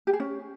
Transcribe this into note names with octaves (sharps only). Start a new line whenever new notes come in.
G4
G#4
C#4